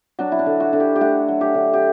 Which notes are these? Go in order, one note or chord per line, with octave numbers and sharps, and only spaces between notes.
F#3 D4
E4
D4
D3
F#4
D3
G4
G4
A3 F#4
F#3
G4
D3
G4